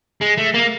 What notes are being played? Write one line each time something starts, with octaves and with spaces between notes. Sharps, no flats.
G#3
A3
A#3